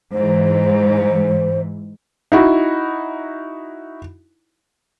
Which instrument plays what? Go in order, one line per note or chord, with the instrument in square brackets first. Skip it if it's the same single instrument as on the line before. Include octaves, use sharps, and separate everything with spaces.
[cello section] G#2 E3 [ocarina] C5
[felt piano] D#4 E4 F#4